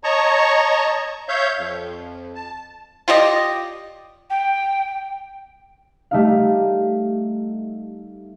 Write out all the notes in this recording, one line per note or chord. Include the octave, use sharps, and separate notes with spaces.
C#5 D#5 A5 A#5 C#6
C#5 E5 F5 G6
F2
A5
F4 G4 D5 D#5
G5
G3 A3 D#4 F5